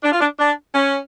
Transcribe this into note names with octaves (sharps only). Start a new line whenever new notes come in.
D4
F4
D4
D4
C#4